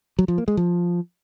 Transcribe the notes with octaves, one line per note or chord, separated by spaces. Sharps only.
F#3
F3
A#3
G#3
F3